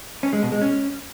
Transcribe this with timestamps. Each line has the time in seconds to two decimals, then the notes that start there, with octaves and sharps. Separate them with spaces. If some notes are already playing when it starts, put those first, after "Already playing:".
0.23 C#4
0.33 G#3
0.42 B2
0.52 G#3
0.61 C#4